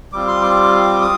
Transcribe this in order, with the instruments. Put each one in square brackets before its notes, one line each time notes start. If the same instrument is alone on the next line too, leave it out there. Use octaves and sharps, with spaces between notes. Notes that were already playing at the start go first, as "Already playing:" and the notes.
[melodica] G3 C4 F4 D6
C6
D6
D#6